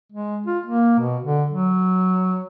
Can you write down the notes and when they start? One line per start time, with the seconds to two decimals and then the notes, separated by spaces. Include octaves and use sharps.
0.12 G#3
0.46 F4
0.66 A#3
0.99 B2
1.24 D3
1.51 F#3